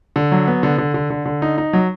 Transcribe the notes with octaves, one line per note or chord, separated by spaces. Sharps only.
D3
F#3
B3
D3
D3
D3
D3
D3
D#4
D#4
F#3